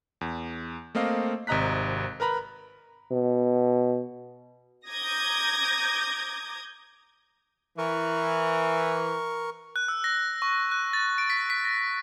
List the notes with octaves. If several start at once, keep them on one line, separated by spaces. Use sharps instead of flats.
E2
A3 A#3 C4 D#5 F5
G#1 C3 D#5 A#5 F#6 B6
A#4 B4 A#5 B5
B2
A#5 D6 D#6 G6 G#6 A#6
E3 A#4 C#6
F#6
E6
A#6
C#6
F#6
A6
D7
B6
B6
A#6